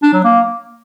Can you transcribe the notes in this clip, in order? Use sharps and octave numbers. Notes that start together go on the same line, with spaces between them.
D4
F#3
A#3